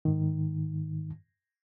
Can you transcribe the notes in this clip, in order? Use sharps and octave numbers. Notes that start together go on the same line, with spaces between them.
G#2 D#3